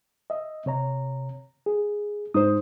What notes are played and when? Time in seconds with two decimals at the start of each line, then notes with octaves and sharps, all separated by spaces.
0.30 D#5 E5
0.66 C3 C#5 A#5
1.66 G#4
2.34 G#2 G#3 D#4 C5 D#6